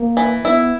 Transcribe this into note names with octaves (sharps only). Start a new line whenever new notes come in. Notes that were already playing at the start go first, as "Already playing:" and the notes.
Already playing: A#3
E3
B3 E4